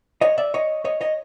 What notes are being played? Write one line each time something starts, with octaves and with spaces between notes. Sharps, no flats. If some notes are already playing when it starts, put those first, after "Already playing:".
C#5 D#5
D5 E5
C#5 D#5
C#5 D#5
C#5 D#5